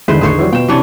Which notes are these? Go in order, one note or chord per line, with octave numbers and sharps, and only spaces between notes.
E2 D3 D#3 G#3 E4 B4 C5
A1 A3 G#4 C5 C#5
E3 F#3 G3
B2 F4 B4 G5 E7
C3 E3 C#4 D4 C#5